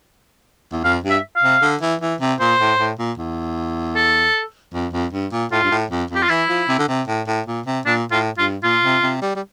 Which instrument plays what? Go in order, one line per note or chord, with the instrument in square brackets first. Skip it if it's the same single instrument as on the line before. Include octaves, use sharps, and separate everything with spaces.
[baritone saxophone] E2
[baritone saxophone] F2 [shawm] F5
[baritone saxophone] G2
[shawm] E5
F5
[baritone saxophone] C3
D3
E3
E3
C3
[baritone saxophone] A#2 [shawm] C5
[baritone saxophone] A2
A2
A#2
E2
[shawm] A4
[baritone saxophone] F2
F2
G2
A#2
[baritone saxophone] A2 [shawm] F4
[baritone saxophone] G2
A2
F2
[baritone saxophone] F2 [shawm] G4
[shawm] F4
[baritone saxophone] E3 [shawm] E4
[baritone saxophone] F3
C3
D3
C3
A2
A2
A#2
C3
[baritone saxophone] A#2 [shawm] D4
[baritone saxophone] A2 [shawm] F4
[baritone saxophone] G2 [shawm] F4
[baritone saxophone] A#2 [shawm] F4
[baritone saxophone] C3
C3
G3
G3